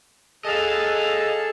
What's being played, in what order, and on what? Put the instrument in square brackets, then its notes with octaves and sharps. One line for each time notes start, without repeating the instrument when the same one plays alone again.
[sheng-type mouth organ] G#4 A4 A5 [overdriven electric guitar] D#5 F5